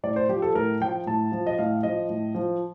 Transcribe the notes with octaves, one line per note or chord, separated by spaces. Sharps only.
A2 D5
C5
F3 G4
A4
A2 A#4
F3 G5
A2 A5
F3
D#5
A2 F5
F3 D#5
A2
F3